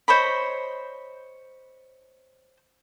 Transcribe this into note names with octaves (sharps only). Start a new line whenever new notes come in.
C5 C#5 D#5 B5